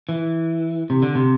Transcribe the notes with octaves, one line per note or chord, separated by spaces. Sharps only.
E3
C3
D3
C3